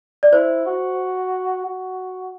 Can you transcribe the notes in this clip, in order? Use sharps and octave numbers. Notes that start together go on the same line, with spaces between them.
D5
E4 C5
F#4
F#4